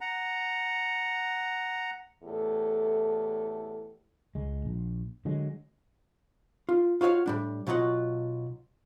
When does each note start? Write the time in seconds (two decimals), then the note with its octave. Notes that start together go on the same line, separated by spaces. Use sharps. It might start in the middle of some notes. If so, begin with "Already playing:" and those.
0.01 F#5 A#5
2.24 E2 A2 G4 A4
4.35 C#2 G#3
4.65 A#1
5.25 D3 F#3 G#3
6.69 F4
7.01 F4 F#4 C#5 E5 F5
7.26 A2 G3 D4
7.67 B1 B2 F#3 F4 D#5 F#5